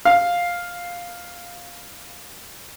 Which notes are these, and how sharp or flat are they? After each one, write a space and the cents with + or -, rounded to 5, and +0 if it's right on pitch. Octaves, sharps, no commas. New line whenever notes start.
F5 +5